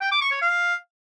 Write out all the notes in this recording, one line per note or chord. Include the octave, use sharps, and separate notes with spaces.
G5
D6
C#6
C#5
F5